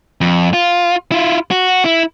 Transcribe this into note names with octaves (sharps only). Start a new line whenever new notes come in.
F2
F4
E4 F4
F#4
E4